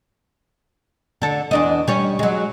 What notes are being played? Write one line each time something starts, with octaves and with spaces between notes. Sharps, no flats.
D3 A4
E2 D4 D#5
G3 C#4
F#3 G#3